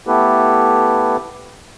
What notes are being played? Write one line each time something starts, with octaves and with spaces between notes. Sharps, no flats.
A3 B3 E4 G4 A4 B4